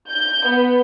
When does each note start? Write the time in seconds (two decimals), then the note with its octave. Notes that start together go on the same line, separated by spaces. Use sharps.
0.10 G6
0.47 B3